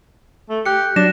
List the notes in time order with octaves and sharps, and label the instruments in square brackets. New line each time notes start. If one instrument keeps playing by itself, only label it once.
[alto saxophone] A3
[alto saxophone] G4 [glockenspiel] F#6 C#7
[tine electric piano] F#3 [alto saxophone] D4 [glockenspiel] A#6 E7